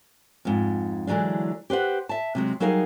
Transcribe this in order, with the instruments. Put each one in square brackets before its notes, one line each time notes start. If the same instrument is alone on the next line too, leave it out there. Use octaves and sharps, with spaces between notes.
[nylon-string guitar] F2 G#2
D3 E3 F#3 G#3 D4
G4 B4 C5 F#5
E5 A5
C3 F#3 G#3
F#3 G3 D#4 G#4 A#4 F5